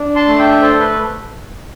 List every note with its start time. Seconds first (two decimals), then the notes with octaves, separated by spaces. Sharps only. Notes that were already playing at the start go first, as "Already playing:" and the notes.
Already playing: D4
0.16 A5 C6
0.27 A3
0.39 E5 G5
0.61 A4 C5
0.80 B4